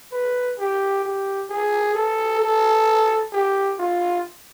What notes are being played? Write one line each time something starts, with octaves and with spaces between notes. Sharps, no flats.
B4
G4
G4
G#4
A4
A4
G4
F4